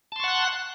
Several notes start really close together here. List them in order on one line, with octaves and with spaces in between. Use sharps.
A5 C6 C#6 F#5 F#6